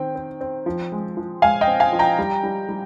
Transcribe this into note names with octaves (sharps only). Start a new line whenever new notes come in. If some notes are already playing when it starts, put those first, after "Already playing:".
Already playing: D#3 C4 G5
C4
C4
F3
G#3
F3
G#3 F5 G#5
D#5 G5
C4
F5 G#5
F3
G5 A#5
G3
G3
G3